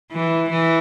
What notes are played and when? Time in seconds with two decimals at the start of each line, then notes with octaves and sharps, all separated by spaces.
0.12 E3
0.50 E3